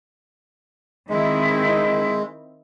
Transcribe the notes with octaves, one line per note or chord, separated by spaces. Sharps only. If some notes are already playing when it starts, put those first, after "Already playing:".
D#3 G#3 C4 E4